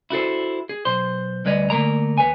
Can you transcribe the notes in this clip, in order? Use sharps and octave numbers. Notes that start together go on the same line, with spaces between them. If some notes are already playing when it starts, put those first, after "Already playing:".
E4 F#4 A4 C5
G#4
B1 C5 C6
D2 G3 B4 C#5 D#5
D3 A3 A#3 A#4 A#5
D#2 B4 C#5 G#5